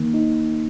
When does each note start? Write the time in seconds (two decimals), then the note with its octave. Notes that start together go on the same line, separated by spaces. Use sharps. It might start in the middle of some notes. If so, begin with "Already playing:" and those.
Already playing: D#3 A#3
0.14 D#4